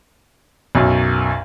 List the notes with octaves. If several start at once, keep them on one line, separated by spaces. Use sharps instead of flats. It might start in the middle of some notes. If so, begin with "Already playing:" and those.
B1 F#2